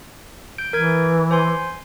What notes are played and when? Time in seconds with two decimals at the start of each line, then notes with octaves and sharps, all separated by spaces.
0.58 G6 D7
0.73 E3 A#4 G#6 D7
1.31 C5 G#5 C6